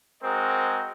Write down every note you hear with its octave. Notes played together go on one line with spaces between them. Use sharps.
G#3 C4 F#4 A#4 D#5